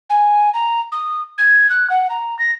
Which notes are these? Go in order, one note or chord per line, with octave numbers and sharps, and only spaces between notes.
G#5
A#5
D#6
G#6
F#6
F#5
A#5
A#6